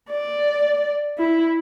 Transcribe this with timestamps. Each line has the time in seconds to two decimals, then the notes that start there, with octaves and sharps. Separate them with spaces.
0.11 D5
1.18 E4